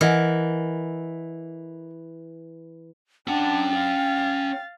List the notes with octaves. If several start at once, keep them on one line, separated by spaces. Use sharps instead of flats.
E3 A#4 D#5 F#5
C#4 D4 F#5 G5 A5
F5 A6